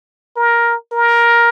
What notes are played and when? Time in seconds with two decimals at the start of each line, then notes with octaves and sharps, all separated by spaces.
0.36 A#4
0.92 A#4